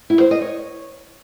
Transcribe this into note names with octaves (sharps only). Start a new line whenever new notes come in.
E4
C5
D#5
C#5